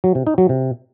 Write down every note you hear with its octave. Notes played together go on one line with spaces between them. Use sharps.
F#3
C3
D#4
F#3
C3